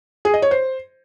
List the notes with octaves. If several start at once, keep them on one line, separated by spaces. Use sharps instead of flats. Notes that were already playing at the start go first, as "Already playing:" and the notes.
G#4
D#5
C#5
C5